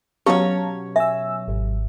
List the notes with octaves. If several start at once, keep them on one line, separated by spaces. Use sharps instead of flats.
B2 F#3 C#4 G4 C#5 F5 A5 A#5
E5 G#5 E6
G#1